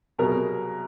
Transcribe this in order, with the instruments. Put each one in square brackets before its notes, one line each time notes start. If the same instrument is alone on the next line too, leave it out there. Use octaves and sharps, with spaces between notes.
[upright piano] C2 B2 F#3 G#4 A#4